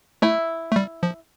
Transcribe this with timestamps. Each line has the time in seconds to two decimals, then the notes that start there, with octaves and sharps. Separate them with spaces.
0.22 A3 E4
0.72 A3
0.76 G3
1.03 F3